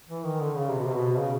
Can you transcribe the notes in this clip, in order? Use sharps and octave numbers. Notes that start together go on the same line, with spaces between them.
E3
D#3
D3
C#3
C3
B2
C3
B2
C#3